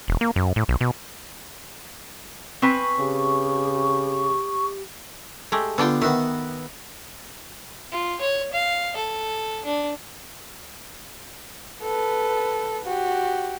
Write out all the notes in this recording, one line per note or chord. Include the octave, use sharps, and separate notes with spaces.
E1
A#3
F#2
A2
B1
B2
C4 B4 G#5 C#6
C#3 G4
G#3 A3 G4
D3 B3 D4 F4 G5
D#3 B3 F#4 E5
F4
C#5
F5
A4
D4
A4 B4
F#4 G4